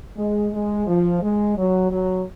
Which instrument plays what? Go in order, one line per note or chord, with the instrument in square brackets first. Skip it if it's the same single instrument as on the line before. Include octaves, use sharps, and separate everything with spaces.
[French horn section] G#3
G#3
F3
G#3
F#3
F#3